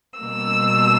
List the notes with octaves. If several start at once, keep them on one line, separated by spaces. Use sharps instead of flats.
B2 G3 A#3 E6